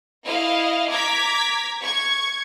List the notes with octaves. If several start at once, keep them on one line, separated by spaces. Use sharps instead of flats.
E4 D#5 F5
A#5 D6 G#6 B6
C#6 G#6